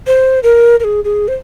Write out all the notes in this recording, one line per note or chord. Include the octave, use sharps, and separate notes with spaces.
C5
A#4
A#4
G#4
G#4
C5